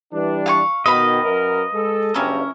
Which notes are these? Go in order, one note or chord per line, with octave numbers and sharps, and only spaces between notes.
E3 G3 D4
F5 G#5 C#6
B2 D#3 B4 D#5 F5 B5
F#2 A#4
G#3 A4
F#1 G2 G3 C#4 E4 A#4